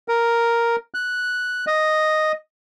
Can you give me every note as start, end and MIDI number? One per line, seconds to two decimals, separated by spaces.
0.08 0.76 70
0.94 1.65 90
1.67 2.32 75